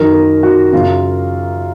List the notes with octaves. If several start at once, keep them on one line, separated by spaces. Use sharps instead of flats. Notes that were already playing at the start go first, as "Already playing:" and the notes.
Already playing: F#2 D#3 A#4
A#4
F#4
F#2 C#3 F4